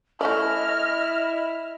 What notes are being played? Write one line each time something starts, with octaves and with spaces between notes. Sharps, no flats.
A3 C#4 E4 D5 D#5 F6